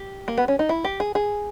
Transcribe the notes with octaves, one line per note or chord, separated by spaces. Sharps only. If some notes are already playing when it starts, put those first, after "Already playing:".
Already playing: G4
A#3
B3
C#4
D#4
E4
G4
G#4
G#4